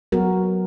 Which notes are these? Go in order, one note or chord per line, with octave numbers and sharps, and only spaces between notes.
F#3 B3 F#4 A#4